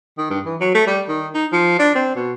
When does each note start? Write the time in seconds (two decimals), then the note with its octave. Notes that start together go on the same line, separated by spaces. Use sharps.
0.18 D#3
0.30 G2
0.45 E3
0.60 F#3
0.74 A3
0.87 G3
1.09 D#3
1.34 D#4
1.52 F3
1.79 D4
1.95 C4
2.15 B2